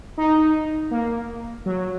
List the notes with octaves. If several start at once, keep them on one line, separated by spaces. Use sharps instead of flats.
D#4
A#3
F#3